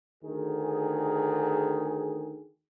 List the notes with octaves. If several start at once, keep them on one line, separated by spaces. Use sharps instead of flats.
D2 D#3 G#4